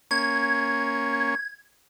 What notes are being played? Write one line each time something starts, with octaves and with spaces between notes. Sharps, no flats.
A#3 C#4 C#6 G#6